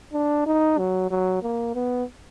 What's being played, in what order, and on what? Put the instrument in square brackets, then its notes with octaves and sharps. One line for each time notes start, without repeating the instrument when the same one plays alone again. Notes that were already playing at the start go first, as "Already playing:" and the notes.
[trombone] D4
D#4
F#3
F#3
A#3
B3